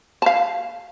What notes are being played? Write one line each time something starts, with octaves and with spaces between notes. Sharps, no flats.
F5 A5